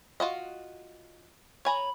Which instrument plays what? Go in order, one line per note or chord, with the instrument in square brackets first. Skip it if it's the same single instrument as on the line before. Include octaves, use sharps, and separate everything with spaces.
[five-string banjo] F4 F#4 D#5
[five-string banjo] C#5 G#5 A#5 [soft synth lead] B5